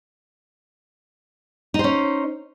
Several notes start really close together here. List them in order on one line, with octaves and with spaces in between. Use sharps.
D#4 C5 C#4